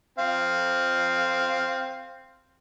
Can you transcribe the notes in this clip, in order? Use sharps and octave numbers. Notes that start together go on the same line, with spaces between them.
C4 F5